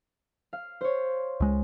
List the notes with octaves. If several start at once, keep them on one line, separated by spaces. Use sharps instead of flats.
F5
C5 C#5
C#2 G#3